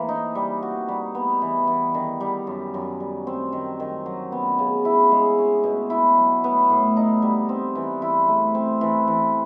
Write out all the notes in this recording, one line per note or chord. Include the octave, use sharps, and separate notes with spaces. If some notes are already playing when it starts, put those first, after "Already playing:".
Already playing: E3 A#3 C4
D#4
G3
F#4
G3
B3
E3
E3
D#3
G3
F#2
F#2
G3
C4
D#3
D#3
F#3
B3
C#3
E4
G#3
C#4
B2
E4
F#3
B3
A2
D#4
G3
C4
E3
E4
A3
C4
E3
E3